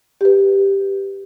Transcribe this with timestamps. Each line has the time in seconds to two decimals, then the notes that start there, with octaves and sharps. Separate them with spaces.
0.21 G4 B4